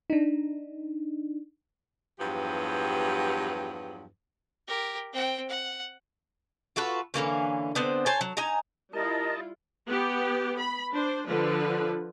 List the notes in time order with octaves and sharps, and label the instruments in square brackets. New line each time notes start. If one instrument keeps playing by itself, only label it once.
[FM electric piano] D4 D#4
[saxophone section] E2 G2 F3 F#3 G4 B4
[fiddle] G4 A#4
C4 G5
F#5
[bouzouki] F4 F#4 A4 B4
D3 E3 A#3 C#4
D3 B3 C4 C5
C5 C#5 G#5 A5
F#3
D#4 G#5 A#5
[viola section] G3 E4 F4 [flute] A#4 [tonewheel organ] D#5 A5
[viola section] B3 G4
B5
D4 C5
D3 F3 B4